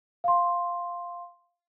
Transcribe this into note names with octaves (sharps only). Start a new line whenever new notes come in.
F5 C6